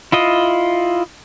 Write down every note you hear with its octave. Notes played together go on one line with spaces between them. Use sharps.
E4 F4 D#5